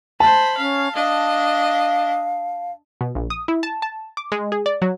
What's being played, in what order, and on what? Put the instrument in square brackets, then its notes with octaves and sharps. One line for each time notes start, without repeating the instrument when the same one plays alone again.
[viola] C5 B5 [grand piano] A5
[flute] C#4 [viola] F5
[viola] D4 D#5 [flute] F5
[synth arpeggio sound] B2
A#1
D#6
E4
A5
A5
D6
G#3
G#4
D5
F#3